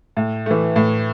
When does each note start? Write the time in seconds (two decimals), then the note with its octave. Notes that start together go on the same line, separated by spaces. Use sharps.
0.17 A2
0.46 E3 A3
0.76 A2